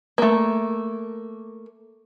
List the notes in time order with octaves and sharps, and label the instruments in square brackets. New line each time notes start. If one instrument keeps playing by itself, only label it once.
[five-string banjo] A3 A#3